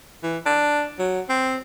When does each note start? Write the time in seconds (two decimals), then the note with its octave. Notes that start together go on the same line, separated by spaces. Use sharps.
0.23 E3
0.46 D4
0.99 F#3
1.29 C4